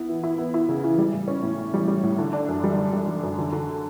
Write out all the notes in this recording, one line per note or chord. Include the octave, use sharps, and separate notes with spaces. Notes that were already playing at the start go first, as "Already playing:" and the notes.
Already playing: B3 E4
E3
E4
B3
E4
C#3
E3
G3
A2
C#4
A2
A2
G3
G3
A2
D3
D4
F#2
G3
D3
G3
G3
F#2
D3
D3